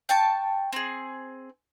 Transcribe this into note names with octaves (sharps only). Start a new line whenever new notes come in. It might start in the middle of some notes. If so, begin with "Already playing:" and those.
G5 A5 C#6
C4 G#4